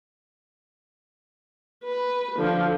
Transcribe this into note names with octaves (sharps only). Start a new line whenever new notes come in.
B4
D3 F3